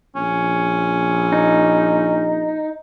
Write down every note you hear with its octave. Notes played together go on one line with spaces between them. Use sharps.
A#1 C#4
D#4